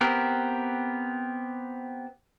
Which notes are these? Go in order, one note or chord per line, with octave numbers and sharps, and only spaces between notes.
B3 C4 G4 A#4